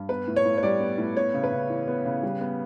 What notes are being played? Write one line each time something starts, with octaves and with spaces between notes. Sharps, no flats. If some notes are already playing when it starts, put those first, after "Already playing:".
Already playing: G2
B3 B4
A2
C#5
A2
C#5
G3 D5
B3
A2
B3 C#5
C#3
B4
C#3
E3
B3
C#3
G3
B3